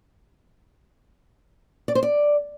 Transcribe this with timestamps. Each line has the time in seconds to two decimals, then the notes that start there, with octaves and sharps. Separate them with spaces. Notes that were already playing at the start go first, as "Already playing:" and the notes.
1.88 D5
1.95 C5
2.03 D5